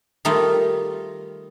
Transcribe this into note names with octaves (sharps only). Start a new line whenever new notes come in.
D#3 G3 A3 D#4 F4